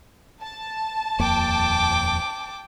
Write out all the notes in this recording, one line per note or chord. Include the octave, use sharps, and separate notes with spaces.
A5
D#1 F2 A#3 G5 D6